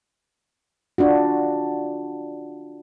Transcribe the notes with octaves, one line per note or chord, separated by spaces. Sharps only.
D4 F4 F#4